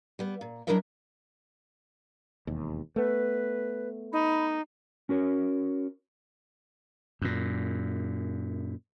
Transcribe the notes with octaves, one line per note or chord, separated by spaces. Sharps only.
G3 B3
A#2
F#3 D4 E4 A#4 D#5 E5
E1 D#2
A3 B3 B4
D#4 B5
C#4 F#4 A#4 C#5
F#2 A#2